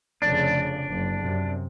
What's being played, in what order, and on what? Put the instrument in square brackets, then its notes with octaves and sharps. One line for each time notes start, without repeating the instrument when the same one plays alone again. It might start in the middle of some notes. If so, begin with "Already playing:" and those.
[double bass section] F1 C#3 [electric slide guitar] D4 D5
[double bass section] F#1
F#2 C3